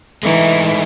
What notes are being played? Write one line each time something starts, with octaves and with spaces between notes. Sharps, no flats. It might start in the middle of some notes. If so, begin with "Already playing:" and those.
E3 G#3 A3 D#4